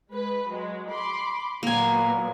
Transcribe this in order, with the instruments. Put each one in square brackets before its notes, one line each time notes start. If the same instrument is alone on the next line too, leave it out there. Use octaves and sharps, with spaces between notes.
[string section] G#3 B4
F#3 G#3
B5 C6 D6
[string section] A#2 F#3 B3 [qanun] A#3 G#5